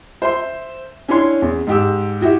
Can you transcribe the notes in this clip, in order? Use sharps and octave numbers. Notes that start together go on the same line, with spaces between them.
C5 E5 C6
C#4 D4 E4 C#5 C6
E2
G#2 G4 E6
E4 F#4 G4 E5